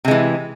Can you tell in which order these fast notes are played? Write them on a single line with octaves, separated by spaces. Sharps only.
C3 G#3 E3